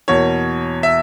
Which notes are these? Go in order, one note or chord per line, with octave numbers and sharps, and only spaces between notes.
E2 B2 A#3 C#5
E5